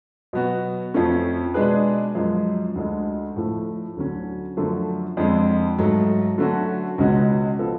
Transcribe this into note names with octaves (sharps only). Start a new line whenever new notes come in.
B2 F#3 B3 F#4
F2 F3 A3 C#4
B2 G#3 D4 G#4 B4
F#2 F3 G#3
D2 D3 G#3
A2 F3 A3
D2 D3 F#3 C#4
F#2 D3 F3 A3
F2 D3 G#3
G#2 F#3 A3
D3 F#3 A3 C#4 F#4
C#2 B2 G#3 C#4 F#4
F3 B3 F4 A4